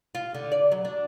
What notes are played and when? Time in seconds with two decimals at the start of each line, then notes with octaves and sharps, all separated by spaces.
0.15 F4
0.34 D3
0.52 D5
0.72 F#3
0.85 D4